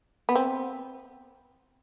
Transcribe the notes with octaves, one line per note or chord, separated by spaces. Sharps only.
B3
C4